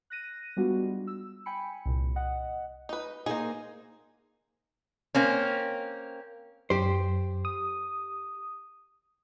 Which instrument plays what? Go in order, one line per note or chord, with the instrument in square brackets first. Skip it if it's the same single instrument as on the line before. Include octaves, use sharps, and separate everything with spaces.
[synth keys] F#6 A#6 D#7
G3 G#3 B3 D4 F4 F#4
E6
G5 G#5 B5 C#7
C2 A#2
D#5 F#5
[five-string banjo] D#4 B4
[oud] A#3 D#4 [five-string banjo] G#4 C5
[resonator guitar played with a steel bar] A#3 C4 C#4
[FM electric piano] F#2 [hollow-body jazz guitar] G4 C5
[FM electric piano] D#6